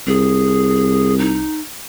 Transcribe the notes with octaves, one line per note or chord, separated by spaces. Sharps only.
C2 G#4
D#4